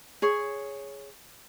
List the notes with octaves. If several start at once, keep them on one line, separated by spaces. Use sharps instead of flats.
G#4 C#5